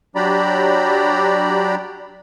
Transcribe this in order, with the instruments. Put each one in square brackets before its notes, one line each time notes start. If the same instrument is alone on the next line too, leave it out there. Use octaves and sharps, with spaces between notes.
[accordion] F#3 D4 G4 D5 A#5 B5